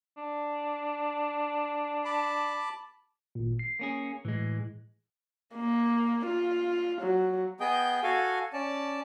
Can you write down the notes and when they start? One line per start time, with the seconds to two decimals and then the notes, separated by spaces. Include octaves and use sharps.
0.18 D4
2.05 A5 B5 D6
3.35 G#1 A#2
3.59 C7
3.79 A#3 C#4 G#4
4.25 A2 E3 G#3
5.55 A#3
6.26 F4
7.01 F#3
7.60 B3 G#4 D#5 G5 G6
8.03 F#4 A4 F5 G#5
8.53 C#4 D5 A5